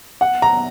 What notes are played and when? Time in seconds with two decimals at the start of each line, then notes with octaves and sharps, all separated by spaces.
0.21 F#5
0.42 A#5